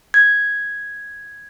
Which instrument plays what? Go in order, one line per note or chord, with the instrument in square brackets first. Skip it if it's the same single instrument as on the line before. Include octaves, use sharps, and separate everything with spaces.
[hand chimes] G#6